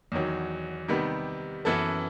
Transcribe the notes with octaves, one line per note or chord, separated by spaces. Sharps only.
E2 D#3 F#3
C3 D#3 G3 B3
F#2 E3 B3 E4 A4